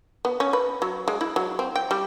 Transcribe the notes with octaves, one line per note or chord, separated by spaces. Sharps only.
B3
C#4
B4
F#3
G#3
E4
F#3
C4
G5
G3